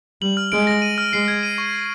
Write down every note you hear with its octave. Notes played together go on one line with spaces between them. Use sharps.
G3 F#7
F6
G#3 D7
A#6
D#7
F6
G#3 C7
G#6
D#7
C#6
A#6